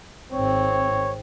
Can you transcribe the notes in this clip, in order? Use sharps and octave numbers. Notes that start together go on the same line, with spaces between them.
G#1 C4 C#5